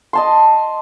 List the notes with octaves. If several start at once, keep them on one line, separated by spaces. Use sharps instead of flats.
D#5 A5 C6